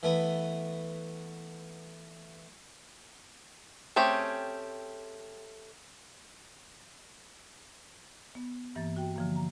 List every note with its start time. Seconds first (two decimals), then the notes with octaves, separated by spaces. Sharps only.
0.03 E3 A3 B3
3.96 A3 C4 C#4 G4 G#4
8.35 B3
8.75 G2 E3 A#3 A6
8.96 F#4 G5
9.16 D3 F3 A#3
9.36 A#5